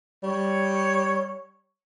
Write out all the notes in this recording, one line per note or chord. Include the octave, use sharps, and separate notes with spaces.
G3 C#5